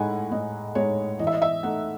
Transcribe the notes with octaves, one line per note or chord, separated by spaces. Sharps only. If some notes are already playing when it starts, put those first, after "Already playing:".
Already playing: A2 G#3 D#4 F#5 G#5
A2 D#5
G#3 D#4 C#5
E3 D#5
E5
D#5
E5
A3 D#4 F#5